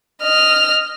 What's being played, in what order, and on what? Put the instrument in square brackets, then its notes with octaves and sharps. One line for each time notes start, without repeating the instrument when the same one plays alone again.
[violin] D#5 F6